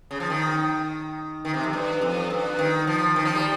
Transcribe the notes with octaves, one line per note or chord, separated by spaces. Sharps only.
C#3
F3
D#3
D#3
C3
F2
G2
F2
G2
D#3
F3
D#3
F3
G3